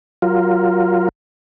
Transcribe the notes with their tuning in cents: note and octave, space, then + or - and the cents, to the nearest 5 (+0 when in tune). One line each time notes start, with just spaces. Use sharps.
F#3 +15 F4 +0 A#4 +0